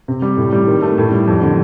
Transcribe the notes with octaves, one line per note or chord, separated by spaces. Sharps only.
C3
G3
A2
G3
D#3
A3
A2
G3
F2
D3